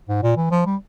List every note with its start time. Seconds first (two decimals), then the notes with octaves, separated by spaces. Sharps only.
0.09 G#2
0.23 A#2
0.37 E3
0.51 F3
0.66 G3